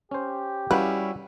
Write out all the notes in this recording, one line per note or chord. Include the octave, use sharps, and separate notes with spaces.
C#4 G4 C5
G3 C#4 E4 F#4 B4 F5 G5